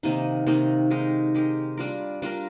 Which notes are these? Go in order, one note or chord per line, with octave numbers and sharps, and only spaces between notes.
C3 D#3 A#3 D#4
C3 D#3 A#3 D#4
G#3 D#4 G4 A#4
G#3 D#4 G4 A#4
G3 D4 F4 A#4
G3 D4 F4 A#4